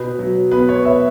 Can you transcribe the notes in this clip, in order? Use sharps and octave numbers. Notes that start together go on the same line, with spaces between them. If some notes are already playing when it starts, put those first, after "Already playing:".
Already playing: B2 B4
F#3
B3 B4
C#5
B4 E5